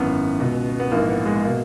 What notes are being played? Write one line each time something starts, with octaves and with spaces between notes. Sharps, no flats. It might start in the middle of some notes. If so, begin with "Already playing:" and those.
Already playing: G#1 F#2 E3 B3
C#2 B2
B3
A#1 G#2 E3 A#3
B3
G#3
B2 A#3